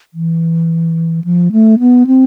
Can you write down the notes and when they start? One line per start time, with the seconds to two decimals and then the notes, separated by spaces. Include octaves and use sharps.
0.14 E3
1.24 F3
1.52 A3
1.79 B3
2.07 C4